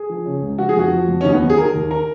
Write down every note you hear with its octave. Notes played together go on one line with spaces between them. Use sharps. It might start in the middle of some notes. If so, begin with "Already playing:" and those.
Already playing: G#4
F3
C#3
C#2
F3 F#4
G#4
F2 F#4
F3
F2
C#4
D#2 D#4
B3
F#3
G#4
D#3 A#4
D#2
A#4